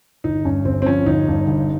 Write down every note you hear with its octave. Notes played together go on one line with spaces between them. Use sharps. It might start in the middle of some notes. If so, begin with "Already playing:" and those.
G1 D#4
G2 C#4
G1 C4
C4
F3 C#4
G1 D#4
G2
G1